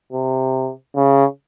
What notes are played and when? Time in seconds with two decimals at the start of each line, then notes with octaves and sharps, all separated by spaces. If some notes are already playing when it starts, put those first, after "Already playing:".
0.13 C3
0.96 C#3